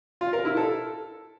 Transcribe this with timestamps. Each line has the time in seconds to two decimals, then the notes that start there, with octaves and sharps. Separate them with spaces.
0.21 F4
0.33 A#4
0.45 E4
0.57 A4